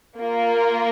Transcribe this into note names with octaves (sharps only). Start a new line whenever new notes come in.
A#3 F4 A#4